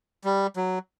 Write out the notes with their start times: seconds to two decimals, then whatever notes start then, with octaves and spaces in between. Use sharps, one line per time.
0.24 G3
0.56 F#3